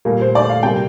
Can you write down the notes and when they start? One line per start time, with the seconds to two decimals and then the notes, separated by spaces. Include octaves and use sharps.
0.05 A#2 G3 A#3
0.21 C5
0.35 D5
0.49 F5
0.63 C3 G3 A#3 G5